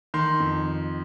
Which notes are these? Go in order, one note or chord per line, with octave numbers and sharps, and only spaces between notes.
D#3 C6
F2